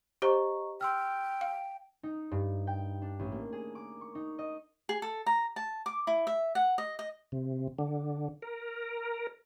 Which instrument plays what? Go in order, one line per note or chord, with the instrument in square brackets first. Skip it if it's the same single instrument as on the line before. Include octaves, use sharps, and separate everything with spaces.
[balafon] G4 C5 [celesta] D#5 A#5 C#6
[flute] G5 [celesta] C6 E6 F6
[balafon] F5
[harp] D#4
G2
G5
D4
A1
A#3
G#4
D6
C#6
D#4
D#5
[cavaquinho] G#4
A4
A#5
A5
D6
E4
E5
F#5
D#5
D#5
[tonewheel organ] C3
D3
A#4